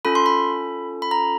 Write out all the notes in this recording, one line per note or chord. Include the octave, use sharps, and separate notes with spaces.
C#4 F4 A4 B5
C6
B5
B5
A#5